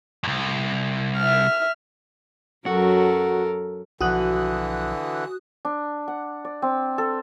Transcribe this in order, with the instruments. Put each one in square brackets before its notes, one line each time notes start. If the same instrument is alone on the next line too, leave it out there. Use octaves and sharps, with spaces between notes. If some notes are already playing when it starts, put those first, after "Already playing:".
[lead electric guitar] C2 F2
[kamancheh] E5 F6
[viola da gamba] F#2 F#3 [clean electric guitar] F#4 [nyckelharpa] A4 A#4
[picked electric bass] B1 F3 [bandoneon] D3 E3 [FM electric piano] F#4 D#6 F#6
[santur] D4
F#5
D5
C4
A4